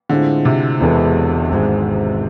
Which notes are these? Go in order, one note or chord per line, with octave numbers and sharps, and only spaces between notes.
A2 D3 G#3 C4 F4
C3
E1 E2 D3 G#3 B3
G#1 G#2 G#3